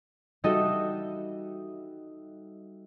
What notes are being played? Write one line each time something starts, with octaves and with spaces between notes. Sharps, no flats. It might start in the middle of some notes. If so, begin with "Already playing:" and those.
G3 D#4 F#4 A4 D#5 E5